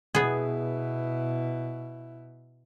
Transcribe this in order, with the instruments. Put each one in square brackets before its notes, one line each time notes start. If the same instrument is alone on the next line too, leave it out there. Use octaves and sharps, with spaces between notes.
[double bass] B2 E4 [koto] B3 G#4